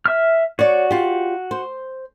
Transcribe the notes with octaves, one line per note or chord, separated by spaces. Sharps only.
E5 F6
F#4 C#5 D5
F4 G4
C5